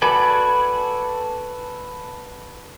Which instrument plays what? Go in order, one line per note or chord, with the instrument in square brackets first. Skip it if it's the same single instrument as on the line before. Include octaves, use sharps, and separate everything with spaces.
[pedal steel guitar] F#4 A4 B4 D5 G#5